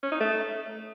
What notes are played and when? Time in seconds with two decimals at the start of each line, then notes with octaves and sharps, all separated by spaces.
0.03 C#4
0.12 D#4
0.20 A3